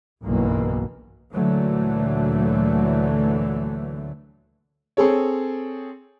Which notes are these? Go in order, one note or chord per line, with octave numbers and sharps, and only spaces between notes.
F#1 B1 G2 B2 E3 A#3
D2 A#2 D3 E3 F#3 A3
C4 G#4 A4 C#5